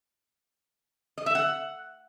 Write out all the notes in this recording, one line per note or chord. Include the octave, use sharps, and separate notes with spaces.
D#5
E5
F#5